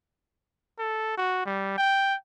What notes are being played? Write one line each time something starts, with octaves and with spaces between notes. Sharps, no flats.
A4
F#4
G3
G5